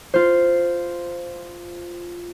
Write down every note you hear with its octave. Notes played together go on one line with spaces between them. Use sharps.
F4 C5